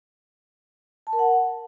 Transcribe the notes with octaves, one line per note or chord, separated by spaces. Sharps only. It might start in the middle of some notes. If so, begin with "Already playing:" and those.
A5
A#4
F#5